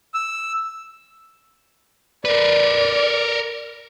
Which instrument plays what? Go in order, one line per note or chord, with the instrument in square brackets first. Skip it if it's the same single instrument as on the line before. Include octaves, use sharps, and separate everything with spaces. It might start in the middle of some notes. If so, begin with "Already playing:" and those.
[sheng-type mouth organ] E6
[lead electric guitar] A#4 B4 [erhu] D5